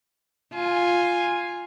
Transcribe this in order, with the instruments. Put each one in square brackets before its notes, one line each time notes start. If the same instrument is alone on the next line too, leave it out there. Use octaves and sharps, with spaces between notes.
[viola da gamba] F4 [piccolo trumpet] G#5